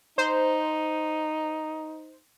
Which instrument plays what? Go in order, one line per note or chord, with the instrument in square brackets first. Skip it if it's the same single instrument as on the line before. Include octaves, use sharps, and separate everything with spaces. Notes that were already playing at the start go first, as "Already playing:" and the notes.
[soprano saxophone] D#4 [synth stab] C5